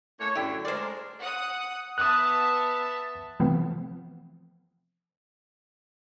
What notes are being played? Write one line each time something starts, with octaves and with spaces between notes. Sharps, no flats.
A3 A#3 C#5
F#2 A2 D3 E4 G4
G#3 A3 A#4 C5 D5
F#5 D#6
B3 E5 A5 D#6 F#6
C3 E3 F3 A3 B3 C4